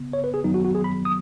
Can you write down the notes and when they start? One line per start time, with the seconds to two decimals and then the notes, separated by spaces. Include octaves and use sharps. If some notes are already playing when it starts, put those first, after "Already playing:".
Already playing: C#3 B3
0.13 C#5
0.24 B4
0.34 G#4
0.44 F#2 D#3 F#3 B3 D#4
0.54 F#4
0.65 F#4
0.75 G#4
0.84 B5
1.05 D#6